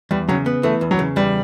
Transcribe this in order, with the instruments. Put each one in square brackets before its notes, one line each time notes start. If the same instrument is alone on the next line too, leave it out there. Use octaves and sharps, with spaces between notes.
[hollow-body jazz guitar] E2 [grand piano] G3
[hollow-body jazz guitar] C#3 [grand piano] F#3
[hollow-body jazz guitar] B3
[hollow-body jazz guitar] E3 [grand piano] A3
[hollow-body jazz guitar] E2
[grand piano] F#3
[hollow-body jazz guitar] C#3
[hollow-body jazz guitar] E2 [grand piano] G3